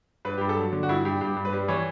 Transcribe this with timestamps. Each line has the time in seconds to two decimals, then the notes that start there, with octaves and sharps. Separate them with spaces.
0.25 G2 B4
0.38 G2 G4
0.49 A4
0.56 F#3
0.72 D3
0.83 F#4
0.89 G2 E4
1.05 G2 G4
1.21 G2 G4
1.36 G2
1.45 B4
1.53 G3
1.68 E3 C#5